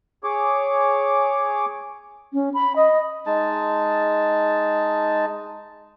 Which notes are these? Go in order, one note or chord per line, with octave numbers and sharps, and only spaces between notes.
G#4 C#5 D6
C#4
B5
D#5
G#3 D#4 A5